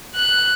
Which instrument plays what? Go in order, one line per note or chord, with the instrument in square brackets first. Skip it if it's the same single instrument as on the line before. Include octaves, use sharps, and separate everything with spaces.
[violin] F#6